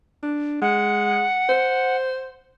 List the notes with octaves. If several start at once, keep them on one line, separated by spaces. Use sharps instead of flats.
D4
G#3 F#5
C5